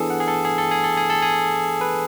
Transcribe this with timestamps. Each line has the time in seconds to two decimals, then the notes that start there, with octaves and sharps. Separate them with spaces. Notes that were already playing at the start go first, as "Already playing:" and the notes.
Already playing: E3 B3 D4 G#4 A4
0.10 F#5
0.20 G#4
0.28 A4
0.45 G#4
0.58 A4
0.71 G#4
0.84 A4
0.97 G#4
1.10 A4
1.22 G#4
1.81 B4